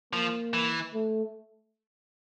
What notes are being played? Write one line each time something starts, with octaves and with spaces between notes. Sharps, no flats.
F3 A#3
E3
A3